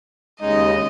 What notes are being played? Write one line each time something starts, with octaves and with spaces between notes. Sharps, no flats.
D#2 C#3 G#3 D#4 D#5